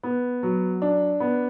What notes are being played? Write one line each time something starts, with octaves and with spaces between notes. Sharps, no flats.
B3
F#3
D4
B3